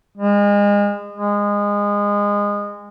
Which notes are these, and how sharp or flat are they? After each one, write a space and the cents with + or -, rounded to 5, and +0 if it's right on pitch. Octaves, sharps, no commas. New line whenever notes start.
G#3 -30
G#3 -25